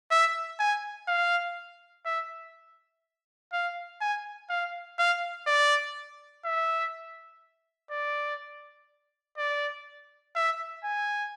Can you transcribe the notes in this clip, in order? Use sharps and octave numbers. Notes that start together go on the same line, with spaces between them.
E5
G#5
F5
E5
F5
G#5
F5
F5
D5
E5
D5
D5
E5
G#5